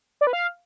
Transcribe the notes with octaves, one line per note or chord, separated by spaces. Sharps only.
D5
B4
F5